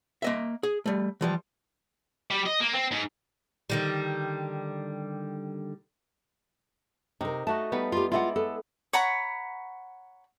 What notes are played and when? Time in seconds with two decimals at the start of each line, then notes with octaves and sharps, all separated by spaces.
0.22 A#3 D#5 E5
0.63 G#4
0.86 G3 A3
1.21 E3 F3 G3
2.31 G3
2.46 D#5
2.61 A#3
2.74 C4
2.91 G#2
3.70 D3 D#3 G3
7.21 C3 D#4 A#4
7.47 A3 F#4 D#5 A5
7.72 G3 B3 D#4
7.92 F4 G4
8.12 G#3 E4 F4 D5 F5 F#5
8.36 B3 A4
8.93 C#5 F#5 A#5 B5